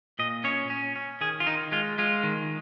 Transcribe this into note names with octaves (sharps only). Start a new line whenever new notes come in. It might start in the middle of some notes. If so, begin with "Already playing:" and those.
A#2 D#5
C#4 C#5
C#4
C#4
D#3 G#4
F4
D#3 D#4
G#3 F4
G#3 F4
D#3